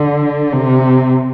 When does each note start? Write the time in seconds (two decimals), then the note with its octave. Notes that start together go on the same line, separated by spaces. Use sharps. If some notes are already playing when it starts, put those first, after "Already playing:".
Already playing: D3
0.53 C3